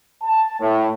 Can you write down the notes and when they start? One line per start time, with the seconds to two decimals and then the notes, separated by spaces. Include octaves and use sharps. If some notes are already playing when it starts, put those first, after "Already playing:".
0.22 A5
0.60 A2